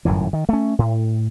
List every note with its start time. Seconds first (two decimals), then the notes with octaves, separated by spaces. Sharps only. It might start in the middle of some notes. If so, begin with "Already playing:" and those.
0.05 G1 F#2 A2 E3
0.33 D#3
0.49 A3 C#4
0.79 A2